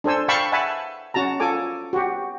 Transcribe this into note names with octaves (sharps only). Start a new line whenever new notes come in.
D4 A4 C5 G#5 E6
F5 G5 A5 B5 C#6 E6
E5 F#5 G#5 A5 B5
C#4 F#4 A5 A#5
F4 A4 G#5 D6
F#4 G4